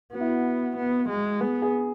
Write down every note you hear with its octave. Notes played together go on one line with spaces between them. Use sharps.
B3 F#4
E4
F#4
B3
G#3
B3 G#4
G#4